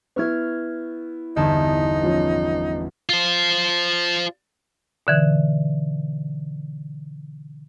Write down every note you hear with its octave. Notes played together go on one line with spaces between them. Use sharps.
B3 E4 C#6 F6 G#6
G1 E2 D#4 A5
F3 C#4
F4 C5
B2 D3 E3